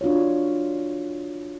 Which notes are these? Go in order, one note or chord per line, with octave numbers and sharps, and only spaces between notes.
D4 F4 F#4 C#5